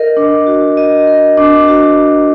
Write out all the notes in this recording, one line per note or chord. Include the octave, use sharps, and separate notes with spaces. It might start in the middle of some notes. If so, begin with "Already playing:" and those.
Already playing: A#4 D#5
D4
F#4
D#5
A#4
D4
F#4